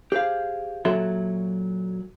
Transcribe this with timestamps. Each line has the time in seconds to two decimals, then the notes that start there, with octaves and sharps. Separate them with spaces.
0.12 G4 G#4 C5 F5
0.85 A#2 F#3 F#4 A4 E5 C6